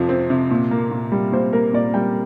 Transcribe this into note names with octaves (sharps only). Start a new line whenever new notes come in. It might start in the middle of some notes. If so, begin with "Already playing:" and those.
Already playing: F2 C3 F3
C4
C3
A#2
A#3
A#2
G3
A#2 C5
A#3 A#4
A#2 D5
G3 G5